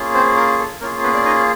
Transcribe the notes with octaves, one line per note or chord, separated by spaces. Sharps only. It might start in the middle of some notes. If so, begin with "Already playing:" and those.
Already playing: A#3 C#4 F4 G#4
C4 C5
A#4
A4
A#3 C#4 F4 G#4 A#4
B3 B4
D5
D#4 D#5